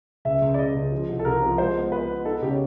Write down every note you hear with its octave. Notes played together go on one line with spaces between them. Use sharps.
C#2 E5
C#2
D5
C#3 D#5
C#2
F3
C2
A4
C2 A#4
F3
G#3 C5
B3
B3 B4
B3
D#4 A4
C#3 G4
C#5